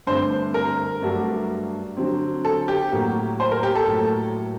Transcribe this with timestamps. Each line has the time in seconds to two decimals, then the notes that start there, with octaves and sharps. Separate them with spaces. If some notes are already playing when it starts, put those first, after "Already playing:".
0.07 G2 D3 A3 C4 C5
0.54 A#4
1.02 G2 F#3 A3 D4 F#4
1.97 D3 F#3 C4
2.45 A4
2.68 G4
2.91 A2 F#3 A#3 F#4
3.40 C5
3.51 A#4
3.63 G4
3.75 A4
3.87 A2 F#3 A#3